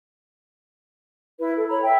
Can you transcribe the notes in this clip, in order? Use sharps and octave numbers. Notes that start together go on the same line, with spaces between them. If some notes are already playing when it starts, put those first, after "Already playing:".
E4 B4
A4
C#5 A#5 B5
E5 G5